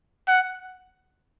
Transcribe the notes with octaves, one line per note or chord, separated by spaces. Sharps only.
F#5